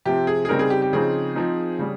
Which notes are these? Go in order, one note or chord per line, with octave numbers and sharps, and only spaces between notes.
C3 F3 C4 G4
G#4
G#4
C#3 G3 C4 D#4 A#4
G#4
G4
G4
C#3 F3 C4 D#4 G#4
F3 C4 D#4
C#3 G3